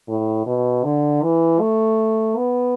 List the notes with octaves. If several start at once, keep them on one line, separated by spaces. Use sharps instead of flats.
A2
B2
D3
E3
A3
B3